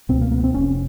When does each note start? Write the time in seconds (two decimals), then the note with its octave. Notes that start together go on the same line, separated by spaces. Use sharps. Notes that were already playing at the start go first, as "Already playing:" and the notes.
0.09 C#2 B2 C4
0.21 A#3
0.32 A#3
0.38 B3
0.44 C4
0.54 F1 F2 C3 C#4